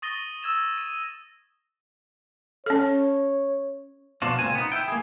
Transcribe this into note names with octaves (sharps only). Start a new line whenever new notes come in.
C#6 D#6 A6 A#6 D#7 G7
E6 G#6 E7
D#7
C#4 A4 C#5
B2 F3 D4 F4 F#4
C#2 A#2 C4 F4 A#4 G#5
B3 D#4
E4 G5
A#3 G#4